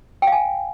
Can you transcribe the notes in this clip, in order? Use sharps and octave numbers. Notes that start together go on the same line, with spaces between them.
G5
F5
G#5